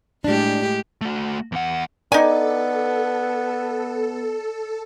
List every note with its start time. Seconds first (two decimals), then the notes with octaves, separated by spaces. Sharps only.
0.24 A2 G3 G#3 D4 G4
1.01 A3 F#4
1.52 E2 F#5
2.12 B3 D#4 A4 D5 G#5